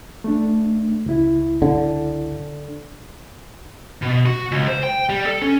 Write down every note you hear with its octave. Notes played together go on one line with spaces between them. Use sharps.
A3 D4
C#2 E4
D3
B2
F#4
C#2
C5
G5
G3
A4
C#4